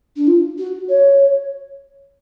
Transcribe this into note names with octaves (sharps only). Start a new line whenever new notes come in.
D4
F4
F#4
C#5